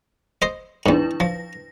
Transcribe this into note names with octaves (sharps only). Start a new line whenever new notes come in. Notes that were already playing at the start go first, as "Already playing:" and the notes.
C5 D#5
E2 G#2 D4 E4 B4
F3 A#6